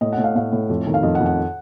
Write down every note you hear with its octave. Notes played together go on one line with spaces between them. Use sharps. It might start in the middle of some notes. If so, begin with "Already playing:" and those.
A2 D#5
F#5
A2
F5
A2 F5
A2
F2
D#3
F5
F2 D#5
F#5
F2
F#5